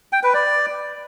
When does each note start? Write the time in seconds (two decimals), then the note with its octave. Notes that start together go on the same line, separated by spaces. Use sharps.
0.13 G5
0.23 B4
0.34 D5